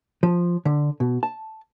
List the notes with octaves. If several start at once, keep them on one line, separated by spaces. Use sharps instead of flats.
F3
D3
B2
A5